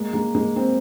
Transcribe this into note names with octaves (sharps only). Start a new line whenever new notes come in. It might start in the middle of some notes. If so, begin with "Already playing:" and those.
Already playing: G#3 A#3
G#3 A#3
G#3 A#3
A#3 C4